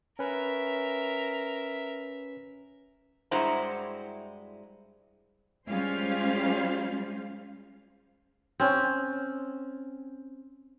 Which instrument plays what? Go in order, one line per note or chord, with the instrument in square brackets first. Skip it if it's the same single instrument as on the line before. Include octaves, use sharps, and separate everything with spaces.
[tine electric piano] C#4 B4 [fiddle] A#4 E5
[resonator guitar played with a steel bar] G2 G#3 E4 F#4 C5 A#5
[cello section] G3 G#3 C#4 F4 C5 F5
[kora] C4 C#4